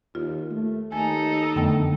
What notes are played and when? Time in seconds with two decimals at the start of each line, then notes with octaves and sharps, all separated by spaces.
0.15 D#2 F4
0.51 A3
0.92 D#2 D#4 A4 G#5
1.56 F2 D3 A3 B3 G5 E6